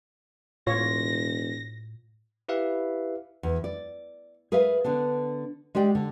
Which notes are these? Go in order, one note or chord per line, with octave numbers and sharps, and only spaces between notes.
E1 A2 F4 C#5 A#6
E4 G4 B4 E5 F5
E2
D5
G#4 A#4 B4 E5 F5
D3 B3 D4
G#3 G4 D5 G5
D3